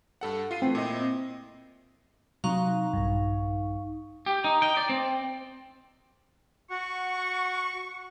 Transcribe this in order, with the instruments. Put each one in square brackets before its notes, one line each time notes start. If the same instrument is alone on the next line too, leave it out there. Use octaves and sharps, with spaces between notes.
[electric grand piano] G2 A4 F#5
F4 C7 D#7
[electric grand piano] E3 A3 [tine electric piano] C4
[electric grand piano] A#2 E4 D#5
[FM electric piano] C3 F#3 A#5 [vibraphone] D#4 F5 C#6
[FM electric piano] A#1 G2
[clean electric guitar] G4
D#4
G5
D5
C4
[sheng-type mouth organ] F#4 F#5 [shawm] C#6